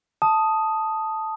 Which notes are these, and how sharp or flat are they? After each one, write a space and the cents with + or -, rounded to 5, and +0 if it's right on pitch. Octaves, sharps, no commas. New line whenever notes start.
A5 +0 D#6 +0